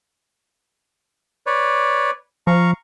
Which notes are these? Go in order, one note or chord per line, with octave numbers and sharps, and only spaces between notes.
B4 C#5 D5
F3 F5 A#5 C#6